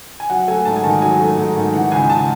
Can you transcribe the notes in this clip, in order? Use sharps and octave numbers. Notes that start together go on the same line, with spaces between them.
G#5
F#3 F#5
A3 G#5
G#2 A5
G#5
D#3 A5
F#3 G#5
A3
G#2
D#3
E3 F#5
C#2 G#5
C#2 A5